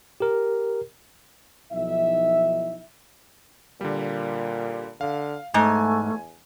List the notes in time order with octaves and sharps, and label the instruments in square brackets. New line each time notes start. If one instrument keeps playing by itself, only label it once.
[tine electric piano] G4 A#4
[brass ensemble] B1 F3 D#4 E4 E5
[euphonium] A#2 [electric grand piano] D3 G3
[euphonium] D3 [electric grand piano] F5
[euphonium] E2 [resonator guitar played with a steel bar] G#2 [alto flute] A3 [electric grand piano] G#5